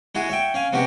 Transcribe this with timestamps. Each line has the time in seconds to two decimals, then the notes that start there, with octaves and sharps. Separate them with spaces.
0.15 G#3 E4 F#4 G#4
0.29 C#5 E5 G5
0.54 C#4 F5 G#5
0.73 C3 G#3 B3 C#4 F#4 G4